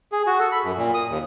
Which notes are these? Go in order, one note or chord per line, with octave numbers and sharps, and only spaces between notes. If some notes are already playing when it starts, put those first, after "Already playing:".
G#4
F#4
A4
B5
F#2
A#2
D#6
D#2